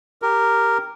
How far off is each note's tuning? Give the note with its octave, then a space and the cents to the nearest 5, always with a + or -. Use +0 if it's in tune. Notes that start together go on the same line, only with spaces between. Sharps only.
G4 +0 A#4 -5